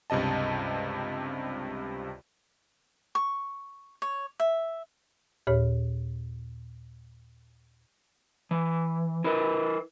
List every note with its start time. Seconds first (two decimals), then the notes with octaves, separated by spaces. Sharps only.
0.10 C#2 G2 C3 D#5 A5
3.15 C#6
4.02 C#5
4.40 E5
5.47 D#2 A#2 G4 C#5
8.51 E3
9.24 E4 A#4 B4